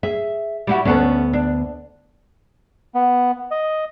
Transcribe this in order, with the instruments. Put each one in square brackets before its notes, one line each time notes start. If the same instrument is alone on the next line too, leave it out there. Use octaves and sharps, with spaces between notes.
[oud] G#4 [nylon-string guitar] E5
[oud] G3 E4 F#4
[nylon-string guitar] D2 B3 A5 [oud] C#4 D4 A4
[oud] D4
[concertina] B3
D#5